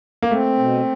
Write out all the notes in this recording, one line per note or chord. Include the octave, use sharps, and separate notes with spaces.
A#3
A3 C4
B2